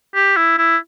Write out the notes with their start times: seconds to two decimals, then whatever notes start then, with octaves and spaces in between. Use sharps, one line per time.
0.15 G4
0.37 E4
0.58 E4